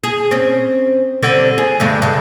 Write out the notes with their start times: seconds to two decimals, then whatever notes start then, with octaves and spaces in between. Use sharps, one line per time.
0.04 G#4
0.31 C4 C#4
1.23 D3 G3 C4
1.58 G#4
1.80 G2 D3 A3
2.02 G2 C#3